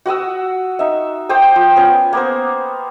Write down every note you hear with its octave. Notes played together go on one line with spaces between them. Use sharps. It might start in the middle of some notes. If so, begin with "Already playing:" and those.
F#4 F#5 D#6 E6
D#4 E5
C5 G5 D6 D#6
F3
B3 C#4
A#3 B3 C5